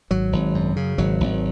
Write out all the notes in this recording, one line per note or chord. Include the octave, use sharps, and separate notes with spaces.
G#1 F#3
G#1
F#2
C#3
G#1 F#3
G#1